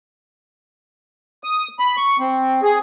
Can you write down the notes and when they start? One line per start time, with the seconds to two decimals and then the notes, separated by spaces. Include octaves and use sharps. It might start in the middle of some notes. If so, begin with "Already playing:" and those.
1.44 D#6
1.79 B5
1.97 C#6
2.19 C4
2.63 G#4